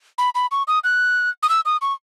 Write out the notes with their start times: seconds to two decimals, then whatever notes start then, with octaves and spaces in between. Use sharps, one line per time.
0.18 B5
0.35 B5
0.51 C#6
0.68 D#6
0.84 F#6
1.43 D#6
1.49 E6
1.65 D#6
1.82 C#6